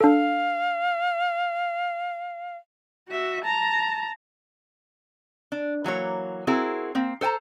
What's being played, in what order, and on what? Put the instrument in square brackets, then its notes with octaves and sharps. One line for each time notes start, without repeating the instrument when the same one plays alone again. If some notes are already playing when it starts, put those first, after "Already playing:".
[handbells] D4 A4 [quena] F5
[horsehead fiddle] F#4 E5
A5 A#5
[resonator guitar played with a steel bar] D4
E3 F#3 A#3 C#5
C4 E4 F#4 G#4 A#4
A#3 C4
A4 C5 G5 A5 A#5